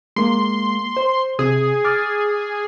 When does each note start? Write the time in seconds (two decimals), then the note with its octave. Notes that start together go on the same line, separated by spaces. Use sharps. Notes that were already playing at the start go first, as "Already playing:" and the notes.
0.16 G#3 A#3 C6
0.97 C5
1.39 C3 G#4
1.85 D6 F6 A6